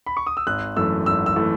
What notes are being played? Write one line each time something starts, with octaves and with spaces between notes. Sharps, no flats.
B5
C#6
D#6
E6
G#1 F#6
F#2 E3 A3 E6
G#1 E6
E6
E3 A3